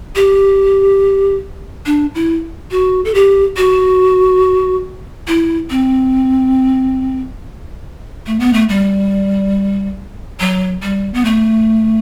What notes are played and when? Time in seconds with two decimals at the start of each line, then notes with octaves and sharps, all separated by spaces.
0.16 G4
1.86 D4
2.15 E4
2.71 F#4
3.05 A4
3.14 G4
3.57 F#4
5.28 E4
5.70 C4
8.27 A3
8.40 B3
8.53 A3
8.69 G3
10.40 F#3
10.82 G3
11.14 B3
11.25 A3